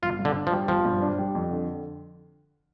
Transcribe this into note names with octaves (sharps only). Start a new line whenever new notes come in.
G1 F4
G2
D3
D4
F3
G3
G1 F3
G2
D4
G3
F2
D3